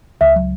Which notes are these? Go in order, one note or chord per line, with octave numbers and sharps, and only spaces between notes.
C#2 E5
F#3